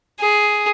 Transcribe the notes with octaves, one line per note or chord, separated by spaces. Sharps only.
G#4